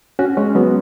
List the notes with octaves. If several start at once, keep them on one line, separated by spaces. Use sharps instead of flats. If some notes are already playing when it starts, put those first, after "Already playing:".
C#4 F#4
G#3 C#4
F#3 B3